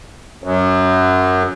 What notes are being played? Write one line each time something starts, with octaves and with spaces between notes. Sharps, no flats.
F#2